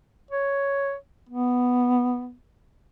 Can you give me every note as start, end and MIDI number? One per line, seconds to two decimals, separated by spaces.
0.31 0.95 73
1.29 2.33 59